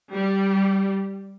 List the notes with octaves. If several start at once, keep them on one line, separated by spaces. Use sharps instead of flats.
G3